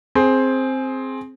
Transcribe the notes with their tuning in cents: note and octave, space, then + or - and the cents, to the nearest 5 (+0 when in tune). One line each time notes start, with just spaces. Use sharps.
C4 +5 G#4 +15